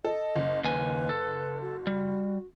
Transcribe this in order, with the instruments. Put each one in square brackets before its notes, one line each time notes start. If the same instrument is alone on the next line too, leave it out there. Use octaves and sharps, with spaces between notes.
[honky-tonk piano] A4 [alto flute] D#5
[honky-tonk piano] F#1
[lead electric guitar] D#2 G#5 [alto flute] B4
[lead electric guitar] A4
[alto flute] F#4
[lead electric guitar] G3